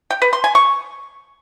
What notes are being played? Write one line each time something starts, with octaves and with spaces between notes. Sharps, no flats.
G5
B4
C6
G#5
C#6